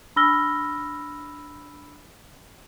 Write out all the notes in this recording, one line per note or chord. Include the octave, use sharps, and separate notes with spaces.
D4 B5 E6 F6 A#6 G7